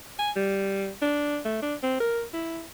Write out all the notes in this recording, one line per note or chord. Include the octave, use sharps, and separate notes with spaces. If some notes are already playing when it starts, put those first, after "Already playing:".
G#5
G3
D4
A3
D4
C4
A#4
E4